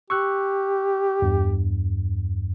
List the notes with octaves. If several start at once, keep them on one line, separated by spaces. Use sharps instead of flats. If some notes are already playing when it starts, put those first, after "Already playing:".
G4 C#6 E6 F#6
E2 G2